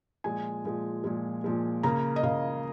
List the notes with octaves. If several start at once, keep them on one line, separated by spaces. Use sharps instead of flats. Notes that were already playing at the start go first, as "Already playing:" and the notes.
A#2 F3 G#3 G#5
A#2 F3 G#3
A#2 F3 G#3
A#2 F3 G#3
C#3 A#3 A#5
D#5
C#3 A#3 F5